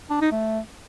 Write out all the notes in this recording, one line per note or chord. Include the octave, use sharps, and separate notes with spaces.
D4
D#4
A3